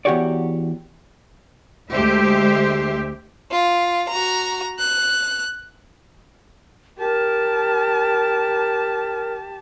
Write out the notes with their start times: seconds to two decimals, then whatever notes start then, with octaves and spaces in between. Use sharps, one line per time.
0.05 E2 B2 F#4 G4 C#5 D5
1.91 D2 G#3 G4 C5 E5
3.51 F4
4.09 F#4 A#5
4.79 F#6
6.98 G4 A#4 A5